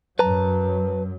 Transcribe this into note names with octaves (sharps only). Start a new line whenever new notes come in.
F#2 F#3 B4 A5 A#5